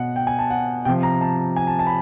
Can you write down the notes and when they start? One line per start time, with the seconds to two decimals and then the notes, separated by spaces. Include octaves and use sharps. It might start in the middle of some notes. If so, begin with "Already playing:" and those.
Already playing: B2 F#5
0.16 G5
0.27 G#5
0.39 A5
0.50 F#5
0.85 C3 F3 G5
1.03 A#5
1.21 A5
1.56 G#5
1.67 A5
1.79 A5
1.87 B5